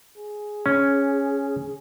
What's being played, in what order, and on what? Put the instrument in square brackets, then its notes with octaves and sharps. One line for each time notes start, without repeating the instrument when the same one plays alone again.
[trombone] G#4
[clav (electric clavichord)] C#4